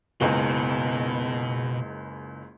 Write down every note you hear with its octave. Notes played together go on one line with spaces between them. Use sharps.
F#1 C#2 B2